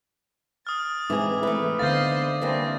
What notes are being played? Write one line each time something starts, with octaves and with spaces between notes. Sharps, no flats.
D#6 F6 A6
E3 G#3 C4 D#4 G#4 D6
E3 A3 B4
D3 B3 C5 D#5 F5 G6 A6
E3 G3 A#3 C4 D4